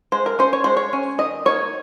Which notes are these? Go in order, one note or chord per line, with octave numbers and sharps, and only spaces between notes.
G#3 C5
A#4
C#4 C5
C#5
G#3 C5
C#5
C#4
D#3 D#5
A#3 D#4 C#5